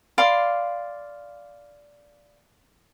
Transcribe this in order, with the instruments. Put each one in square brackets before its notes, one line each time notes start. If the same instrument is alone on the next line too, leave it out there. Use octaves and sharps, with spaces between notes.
[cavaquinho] D5 F5 B5 C6